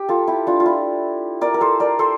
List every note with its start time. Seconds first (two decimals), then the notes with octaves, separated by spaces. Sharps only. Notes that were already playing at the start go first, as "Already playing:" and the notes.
Already playing: G4
0.09 F4 A4
0.28 E4 G4
0.47 D4 F4
0.60 F4
0.66 E4
1.41 A#4 D5
1.54 A#4
1.61 A4 C5
1.80 A#4 D5
1.99 A4 C5